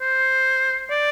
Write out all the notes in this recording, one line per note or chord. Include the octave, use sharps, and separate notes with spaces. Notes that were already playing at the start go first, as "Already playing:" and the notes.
C5
D5